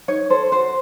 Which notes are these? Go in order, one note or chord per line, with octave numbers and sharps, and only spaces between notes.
D#4 C#5
A4 C5
F#4 C5